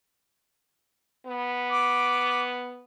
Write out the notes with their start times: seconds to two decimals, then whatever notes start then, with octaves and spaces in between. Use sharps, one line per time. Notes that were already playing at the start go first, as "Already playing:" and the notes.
1.26 B3
1.70 D6